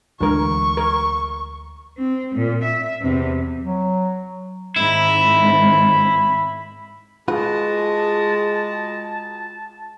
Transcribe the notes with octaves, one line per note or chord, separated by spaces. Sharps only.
D2 D3 E3 G#3 A#4 C#6
A#4
C4
A#2
E5
E2 C3
F#3
G#2 D#3 C4 E4 E5 B5
G#3 F4 F#4 G#4 B4 D#5 A5